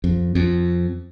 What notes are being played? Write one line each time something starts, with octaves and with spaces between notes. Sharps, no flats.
F2
F2